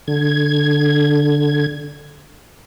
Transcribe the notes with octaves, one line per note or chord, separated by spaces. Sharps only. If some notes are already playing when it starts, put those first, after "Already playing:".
D3 G#6